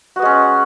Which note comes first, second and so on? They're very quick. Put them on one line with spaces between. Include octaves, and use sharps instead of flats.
F#4 B3 G#3 C#4